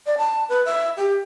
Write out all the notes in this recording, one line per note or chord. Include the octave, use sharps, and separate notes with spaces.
D5
A5
B4
E5
G4